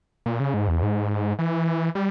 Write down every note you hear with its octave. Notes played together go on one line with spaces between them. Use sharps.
A#2
C#3
G#2
E2
G#2
E3
G3